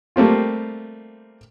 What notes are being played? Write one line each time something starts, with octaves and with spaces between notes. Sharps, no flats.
G3 A3 A#3 C4 F4